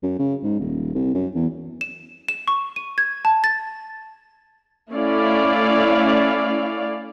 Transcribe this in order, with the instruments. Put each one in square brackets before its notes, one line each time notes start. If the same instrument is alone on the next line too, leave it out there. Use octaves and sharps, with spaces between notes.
[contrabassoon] F#2
C#3
G#2
D#1
C2
F#2
E2
[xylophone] E7
E7
C#6
D#7
G#6
A5
A6
[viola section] A3 C#4 E4 D5 F5